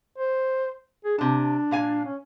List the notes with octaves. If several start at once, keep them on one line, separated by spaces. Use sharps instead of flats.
C5
G#4
C3 D4 A5
A#2 F5 G#5
C#4